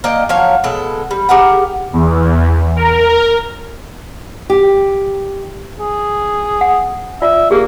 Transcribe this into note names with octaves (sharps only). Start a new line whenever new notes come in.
A#3 D5 D#5 G5
F3 F#3 C#5 F5
B2 G#3 A4
G3
G4 G#4 A#4 F#5
E2
A#4
G4
G#4
F#5
F4 D5 E5
A#3 G4 G#4